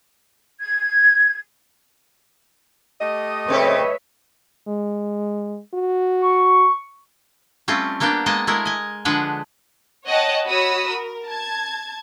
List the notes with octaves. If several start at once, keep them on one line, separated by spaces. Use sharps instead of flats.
G#6
A3 G4 D#5
C#3 C4 A4 B4 C#5 E5
G#3
F#4
C#6
G3 A3 C4 C#4 F4
G3 A#3 B3 D4 G4
G#3 A#3 B3 D#5 A5
G#3 A3 E4 A#4
D#5 G#5
D3 F3 G#3 D4 B4 F#5
C#5 D#5 F#5 G5 A5 F#6
F#4 C#5 B5 D#6 E6
A#4
A5 G#6